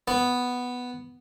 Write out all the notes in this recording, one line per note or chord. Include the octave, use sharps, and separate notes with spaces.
B3